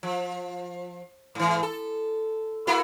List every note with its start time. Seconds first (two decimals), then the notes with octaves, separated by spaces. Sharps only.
0.03 F3
1.35 G#2 E3
1.63 A4
2.67 A#3 E4 F#4